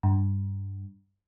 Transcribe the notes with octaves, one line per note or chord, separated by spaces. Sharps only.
G2